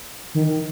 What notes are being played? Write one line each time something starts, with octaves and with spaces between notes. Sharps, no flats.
D#3